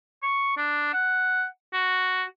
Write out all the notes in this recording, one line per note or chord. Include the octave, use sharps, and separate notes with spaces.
C#6
D4
F#5
F#4